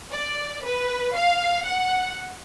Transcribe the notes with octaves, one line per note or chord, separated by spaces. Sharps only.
D5
B4
F5
F#5